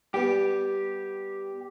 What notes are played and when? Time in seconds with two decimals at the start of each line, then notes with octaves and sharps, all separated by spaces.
0.14 G3 B3 G4